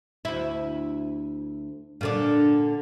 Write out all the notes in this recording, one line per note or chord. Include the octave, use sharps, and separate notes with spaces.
D2 E4
A#2 D3 D4